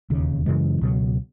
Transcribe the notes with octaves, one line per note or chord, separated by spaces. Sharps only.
E1 D#2 C#3
F#2 C#3 E3 G#3
C#2 B2 F#3